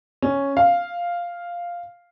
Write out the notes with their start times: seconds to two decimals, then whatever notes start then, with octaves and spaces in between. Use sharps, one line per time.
0.22 C#4
0.57 F5